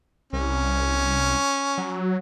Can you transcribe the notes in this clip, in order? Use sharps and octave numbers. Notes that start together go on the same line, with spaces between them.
C2 C#4
F#3